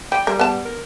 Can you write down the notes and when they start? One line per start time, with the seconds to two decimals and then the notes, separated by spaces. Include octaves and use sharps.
0.12 G3 G5
0.27 G3 A#4
0.39 B3 A5
0.65 A#4